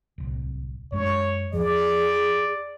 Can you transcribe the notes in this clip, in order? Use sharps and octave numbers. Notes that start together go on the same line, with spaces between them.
D1 C2
F#2 G#3 D4 C#5
E2 F3 G#4 D5